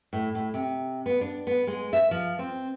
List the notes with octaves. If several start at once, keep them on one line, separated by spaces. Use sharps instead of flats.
A2
A2
C3
B3
D4
B3
G#3
E5
F3
C4